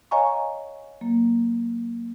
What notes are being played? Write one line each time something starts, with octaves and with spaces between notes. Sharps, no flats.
C#5 D#5 F5 G#5 A#5 C#6
F#3 A#3